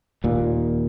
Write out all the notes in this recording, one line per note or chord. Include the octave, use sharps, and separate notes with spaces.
D#2 A#2